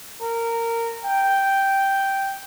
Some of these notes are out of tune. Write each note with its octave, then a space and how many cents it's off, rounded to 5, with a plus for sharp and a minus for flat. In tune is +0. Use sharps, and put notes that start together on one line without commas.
A#4 -15
G5 -5